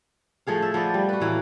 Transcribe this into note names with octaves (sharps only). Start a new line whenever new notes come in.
F3 A3 G#4 F5
E5
F3 B3 D5
G3
F#4 B4
A2 E3 A#3